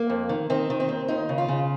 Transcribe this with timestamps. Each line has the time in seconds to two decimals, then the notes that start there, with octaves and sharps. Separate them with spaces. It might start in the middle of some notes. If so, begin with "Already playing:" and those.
Already playing: A#3
0.10 F2
0.29 D#3
0.50 D#3 C4
0.70 D#3
0.80 C4
0.89 D#2
1.08 D#2 D#4
1.29 C#3
1.38 F4
1.48 C#3